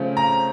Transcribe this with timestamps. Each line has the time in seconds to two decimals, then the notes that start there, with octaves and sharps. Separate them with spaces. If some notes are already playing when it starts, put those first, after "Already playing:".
Already playing: C#3 F3 A3 C4
0.17 A#5